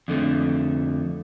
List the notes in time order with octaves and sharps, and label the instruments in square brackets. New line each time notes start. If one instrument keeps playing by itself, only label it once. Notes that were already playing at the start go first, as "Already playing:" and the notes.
[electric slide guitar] F2 D3 A3